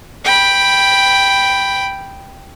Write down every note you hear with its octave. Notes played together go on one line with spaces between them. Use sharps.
G5 B5